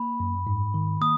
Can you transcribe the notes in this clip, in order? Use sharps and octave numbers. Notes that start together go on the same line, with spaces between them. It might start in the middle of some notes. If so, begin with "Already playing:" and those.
Already playing: A#3 B5
F#2
G#2
D#3
A#3 D#6